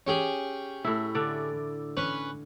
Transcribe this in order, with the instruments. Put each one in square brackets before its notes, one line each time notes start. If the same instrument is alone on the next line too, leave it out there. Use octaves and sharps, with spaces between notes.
[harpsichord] C#4 G4 G#4
[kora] A2 E4
D3 D5
[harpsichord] C#4 B4